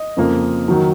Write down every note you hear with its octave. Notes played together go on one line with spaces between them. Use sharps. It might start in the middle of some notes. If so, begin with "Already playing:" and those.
Already playing: D#5
F2 C#3 F3 A#3
D#3 F#3